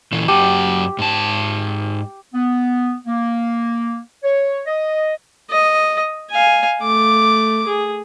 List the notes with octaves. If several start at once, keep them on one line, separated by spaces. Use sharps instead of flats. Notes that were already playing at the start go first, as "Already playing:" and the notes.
A#2 E3
F#2 F#4 G4 A5
G#2 A5
B3
A#3
C#5
D#5
D#5
F5 G#5
A3 D6
G#4